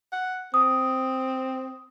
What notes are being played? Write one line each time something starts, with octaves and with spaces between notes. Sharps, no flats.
F#5
C4 D#6